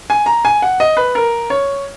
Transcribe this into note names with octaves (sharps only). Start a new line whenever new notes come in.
G#5
A#5
G#5
F#5
D#5
B4
A#4
C#5